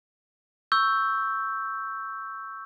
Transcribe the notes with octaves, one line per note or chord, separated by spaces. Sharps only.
C#6 E6 G6